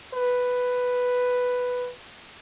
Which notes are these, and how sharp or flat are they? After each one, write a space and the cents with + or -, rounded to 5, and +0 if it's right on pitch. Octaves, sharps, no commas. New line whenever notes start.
B4 +5